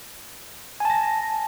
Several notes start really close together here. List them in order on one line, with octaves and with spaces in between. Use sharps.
G#5 A5 A#6